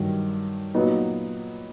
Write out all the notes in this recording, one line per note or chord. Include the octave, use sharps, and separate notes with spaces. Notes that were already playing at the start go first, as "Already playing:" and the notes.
Already playing: G2 D#3 F#3
A#2 F#3 B3 D#4